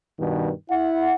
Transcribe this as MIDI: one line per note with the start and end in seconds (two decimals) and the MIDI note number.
0.18 0.50 43
0.18 0.50 47
0.18 0.50 51
0.70 1.15 64
0.70 1.15 78